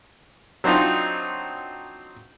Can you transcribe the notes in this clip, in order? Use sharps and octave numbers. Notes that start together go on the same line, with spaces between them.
F#3 C4 D4 D#4 F4